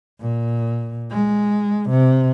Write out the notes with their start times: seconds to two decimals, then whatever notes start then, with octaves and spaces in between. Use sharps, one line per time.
0.20 A#2
1.11 G#3
1.90 C3